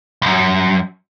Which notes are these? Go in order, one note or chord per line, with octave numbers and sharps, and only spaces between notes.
C2 F#2